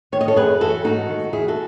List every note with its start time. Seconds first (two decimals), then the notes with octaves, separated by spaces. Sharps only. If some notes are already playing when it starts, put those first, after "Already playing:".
0.12 D#3 C#5
0.21 D#5
0.28 A4 C#5
0.36 F#2 G#4 B4
0.61 E3 F#4 A4
0.84 G#2 D#4 F#4
1.09 D#3
1.32 E2 E4 G#4
1.48 F#4 A4